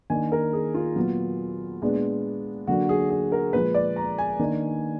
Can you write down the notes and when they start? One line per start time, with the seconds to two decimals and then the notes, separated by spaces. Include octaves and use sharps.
0.10 D#3 A#3 D4 G#5
0.32 A#4
0.53 G#4
0.74 F4
0.96 A#2 F#3 B3
1.82 A#2 G#3 B3 D4
2.67 D3 F#3 A#3 D4 F#4
2.89 G#4
3.10 G#4
3.32 A#4
3.53 A#2 F3 G#3 B4
3.74 D5
3.96 A#5
4.18 G#5
4.39 D#3 A#3 D4